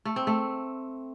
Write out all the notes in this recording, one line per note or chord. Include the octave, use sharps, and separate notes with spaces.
A3
C4
A3